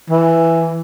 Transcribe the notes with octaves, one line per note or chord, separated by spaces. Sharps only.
E3